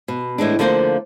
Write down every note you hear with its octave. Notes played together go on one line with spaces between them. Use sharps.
B2
A2 E3 G#3 D4
D3 F3 A3 A#3 F4 C5